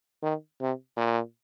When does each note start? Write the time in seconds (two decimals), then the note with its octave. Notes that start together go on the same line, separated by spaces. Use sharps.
0.22 D#3
0.60 C3
0.97 A#2